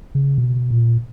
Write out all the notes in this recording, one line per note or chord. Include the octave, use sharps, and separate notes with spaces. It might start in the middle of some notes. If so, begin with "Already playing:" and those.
C#3
B2
A#2